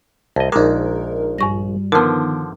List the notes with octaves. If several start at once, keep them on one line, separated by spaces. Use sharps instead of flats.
C2 D#5 A5
A#1 G#3 D#4 A#4 D6
G2 G3 C#6 A#6
D3 D#3 F3 B3 A#4 A5